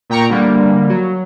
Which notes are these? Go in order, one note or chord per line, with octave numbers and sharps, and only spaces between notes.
A#2 G5 A#5 C#6
D3 G3 A#3
F#3